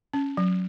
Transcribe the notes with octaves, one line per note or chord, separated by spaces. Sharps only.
C#4
F#3